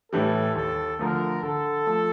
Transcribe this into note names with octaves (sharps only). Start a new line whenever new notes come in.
A2 E3 G3 A4
D#2 A4
D3 F3 A3 A#4
D3 A4
F3 A3